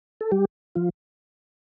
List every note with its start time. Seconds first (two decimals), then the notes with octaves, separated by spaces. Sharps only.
0.21 A4
0.32 G3 G4
0.75 F3 F4